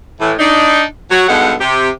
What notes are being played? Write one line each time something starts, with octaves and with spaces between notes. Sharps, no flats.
A2 E3
D4 D#4
F#3 F#4
G2 B2 G#3 D#4 A4 F#5
C3 G4